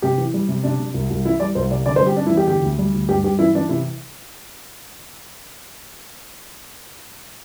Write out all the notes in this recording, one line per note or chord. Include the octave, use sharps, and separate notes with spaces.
C3 G4
E3
G3
C3
C3 D4
C3
C2
C2
E3 E4
G3 D5
C2 C5
C3 D5
D3 D5
C5
G3 G4
G3 D4
E4
E2
G4
D3 G4
D2
G3
D2
G2 G4
G2 G4
E3 E4
E3 D4
C3 E4